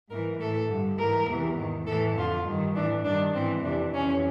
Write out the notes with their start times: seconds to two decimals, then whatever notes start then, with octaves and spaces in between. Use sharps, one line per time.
0.10 G#2 E3 A#4
0.40 A2 E3 A4
0.70 G2 D3
0.99 G#2 E3 A#4
1.28 E2 C3 E3
1.58 G#2 D#3
1.87 A2 E3 A4
2.17 F2 D3 F4
2.47 G2 D#3
2.76 A2 E3 D4
3.04 G2 D#3 D4
3.35 G#2 E3 C4
3.63 F2 C3 E3 D4
3.93 F2 C3 E3 C#4